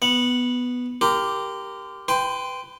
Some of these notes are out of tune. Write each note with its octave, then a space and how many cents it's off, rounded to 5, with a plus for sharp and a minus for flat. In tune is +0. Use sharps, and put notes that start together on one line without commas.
B3 +0 F#5 -10
G4 +0 A#4 +0 C6 -30
B4 +20 G5 +5 C6 -20